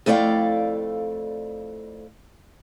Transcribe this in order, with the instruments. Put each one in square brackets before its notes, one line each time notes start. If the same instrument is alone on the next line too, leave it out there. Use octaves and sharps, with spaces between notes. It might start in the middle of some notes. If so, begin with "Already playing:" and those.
[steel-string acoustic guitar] F2 A3 E4 D5 F5 G5